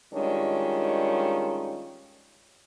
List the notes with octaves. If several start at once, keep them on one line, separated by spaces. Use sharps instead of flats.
D#3 G3 G#3 C#4 D4 F4